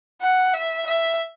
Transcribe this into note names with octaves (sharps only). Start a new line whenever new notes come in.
F#5
E5
E5